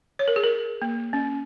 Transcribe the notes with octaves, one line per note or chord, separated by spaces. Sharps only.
C#5
A#4
G#4
A#4
A#3
C#4